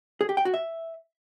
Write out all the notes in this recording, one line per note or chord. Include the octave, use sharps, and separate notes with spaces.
G#4
G4
G5
F#4
E5